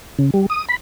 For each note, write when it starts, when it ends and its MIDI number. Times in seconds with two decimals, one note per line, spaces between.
0.19 0.30 49
0.34 0.46 55
0.50 0.65 87
0.68 0.76 83